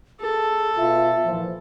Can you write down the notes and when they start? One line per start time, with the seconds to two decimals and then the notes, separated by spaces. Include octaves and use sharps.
0.20 G#4 A4
0.77 B2 F4 E5
1.25 A#2 E3 F3